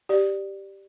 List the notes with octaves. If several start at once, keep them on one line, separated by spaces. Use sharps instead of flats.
G4 D5